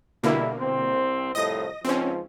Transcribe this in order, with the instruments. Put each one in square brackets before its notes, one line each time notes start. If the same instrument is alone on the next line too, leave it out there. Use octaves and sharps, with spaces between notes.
[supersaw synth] B2 D3 A#3 [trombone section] G3 E4
[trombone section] C2 C4
[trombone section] C2 F2 A2 [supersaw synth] D#5 D#6 A#6
[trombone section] C#2 G#2 F3 [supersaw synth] C4 C#4